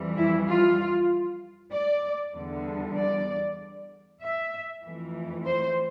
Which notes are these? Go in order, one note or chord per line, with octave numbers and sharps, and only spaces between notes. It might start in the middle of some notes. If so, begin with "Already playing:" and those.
Already playing: F2 E3 G3
E4
F4
D5
E2 D3 G3
D5
E5
F2 E3 A3
C5